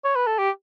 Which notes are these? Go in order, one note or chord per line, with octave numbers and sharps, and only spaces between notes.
C#5
B4
A4
G4